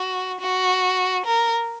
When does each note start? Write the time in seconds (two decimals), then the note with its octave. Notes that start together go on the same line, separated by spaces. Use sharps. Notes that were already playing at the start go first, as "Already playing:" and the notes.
Already playing: F#4
0.40 F#4
1.26 A#4